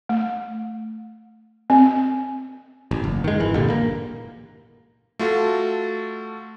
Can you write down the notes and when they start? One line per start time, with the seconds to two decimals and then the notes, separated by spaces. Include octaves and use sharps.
0.09 A3
1.70 C4
2.91 A1
3.04 F#1
3.24 D#3 G#3
3.40 G#1 E3
3.55 G2 A#2 D3 G3
3.70 A#3
5.19 A3 F4 F#4 A4